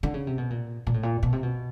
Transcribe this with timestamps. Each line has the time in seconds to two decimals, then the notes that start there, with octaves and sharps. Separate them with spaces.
0.03 D3
0.14 C#3
0.27 C3
0.38 B2
0.50 A#2
0.87 A#2
0.94 A2
1.03 A#2
1.23 B2
1.33 C3
1.43 B2